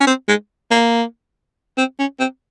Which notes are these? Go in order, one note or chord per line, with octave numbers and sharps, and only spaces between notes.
C#4
C4
G#3
A#3
C4
C#4
C4